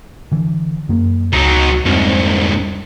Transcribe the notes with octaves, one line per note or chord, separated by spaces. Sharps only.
D3 E3
F#2 A#3
C#2 F#3 D#4
C2 F2 G#2 C4